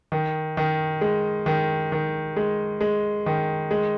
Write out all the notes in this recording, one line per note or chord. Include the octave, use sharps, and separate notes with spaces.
D#3
D#3
G#3
D#3
D#3
G#3
G#3
D#3
G#3